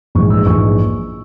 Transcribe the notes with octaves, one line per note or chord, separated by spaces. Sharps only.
A#1 G#2 E3 G#3 C#6
E6
A#1 G#2 E3 G#3 C#6